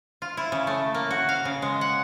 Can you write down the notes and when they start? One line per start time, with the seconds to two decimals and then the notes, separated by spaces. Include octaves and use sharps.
0.22 F4
0.37 E4
0.52 C#3
0.67 A3
0.94 A#3
1.11 F#4
1.29 F5
1.45 C#3
1.62 G#3
1.81 F#5